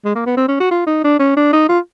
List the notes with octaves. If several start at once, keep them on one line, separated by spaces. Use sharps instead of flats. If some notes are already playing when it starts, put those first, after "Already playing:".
G#3
A#3
B3
C4
C#4
F#4
F4
D#4
D4
C#4
D4
D#4
F4